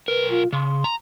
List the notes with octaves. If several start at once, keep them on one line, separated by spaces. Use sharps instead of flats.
B1 A#4 B4
F4
C#3 C6
A#5